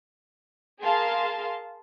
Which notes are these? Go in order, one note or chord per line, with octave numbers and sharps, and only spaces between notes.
G#4 A#4 F5 A5 C6